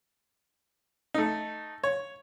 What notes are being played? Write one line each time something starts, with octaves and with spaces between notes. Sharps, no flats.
A3 D#4
C#5